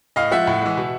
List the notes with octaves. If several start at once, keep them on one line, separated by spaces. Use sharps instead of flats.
A2 D#5 F5
F3 G#3 E5 F#5
A2
E3 G#3
B2